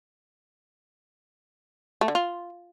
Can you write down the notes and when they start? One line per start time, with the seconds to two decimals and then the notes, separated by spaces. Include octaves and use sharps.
2.01 A3
2.08 D3
2.15 F4